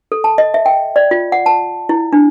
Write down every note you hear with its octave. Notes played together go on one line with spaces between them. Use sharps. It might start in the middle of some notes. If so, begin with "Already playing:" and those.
A4
A5
D#5
E5
G5
D5
F4
F#5
A5
E4
D4